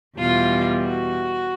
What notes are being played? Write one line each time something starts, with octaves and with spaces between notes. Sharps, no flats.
E2 B2 G3 F4
F#4